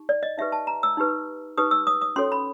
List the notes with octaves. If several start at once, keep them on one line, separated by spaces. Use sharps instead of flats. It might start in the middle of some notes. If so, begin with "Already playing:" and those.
Already playing: D#4 G4
D5
D#5
D#4 G4 B4 E5
A5
A#5
E6
D#4 G4 B4
D#4 G4 B4 D#6
E6
D#6
D#6
C#4 F#4 A4 C#5 C6
B5